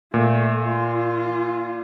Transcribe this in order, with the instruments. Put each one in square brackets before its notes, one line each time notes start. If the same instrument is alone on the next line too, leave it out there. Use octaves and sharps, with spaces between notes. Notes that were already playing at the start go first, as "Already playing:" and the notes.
[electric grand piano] A#2 [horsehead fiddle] A3
[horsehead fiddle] F4